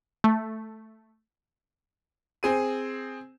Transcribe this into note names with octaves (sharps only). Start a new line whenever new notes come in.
A3
C4 G#4 D#7